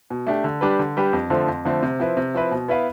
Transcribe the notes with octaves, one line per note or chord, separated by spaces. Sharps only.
B2
A3 D4 G4
D3
G3 D4 G4 B4
D3
G3 D4 G4 B4
F2
D3 F3 A3 C4
F2
D3 F3 A3 C4
C3
F3 C4 E4 B4
C3
F3 C4 E4 B4
B2
B3 E4 B4 F5